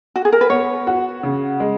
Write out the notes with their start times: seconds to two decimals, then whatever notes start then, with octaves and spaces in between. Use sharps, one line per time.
0.16 F#4
0.25 G#4
0.32 A#4
0.41 B4
0.50 B3 C#5
0.87 F#4
1.23 C#3
1.60 G#3